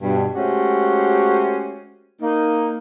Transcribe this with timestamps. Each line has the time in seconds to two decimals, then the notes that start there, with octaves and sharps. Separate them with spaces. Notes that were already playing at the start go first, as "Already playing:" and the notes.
0.01 G2 B2
0.34 G#3 A3 C#4 F#4 G4 C5
2.22 A#3 D#4